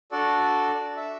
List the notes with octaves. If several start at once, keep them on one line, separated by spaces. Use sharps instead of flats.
D4 F#4 A4 D5
E5